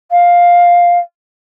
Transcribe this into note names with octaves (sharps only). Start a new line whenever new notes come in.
F5